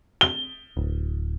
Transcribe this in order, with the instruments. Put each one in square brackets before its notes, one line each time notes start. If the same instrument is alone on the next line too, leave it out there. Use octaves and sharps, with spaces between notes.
[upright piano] G7
[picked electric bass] D1